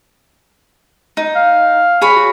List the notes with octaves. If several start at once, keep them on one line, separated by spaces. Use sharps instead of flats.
D#4
F5
G#4 C#5 B5
F#4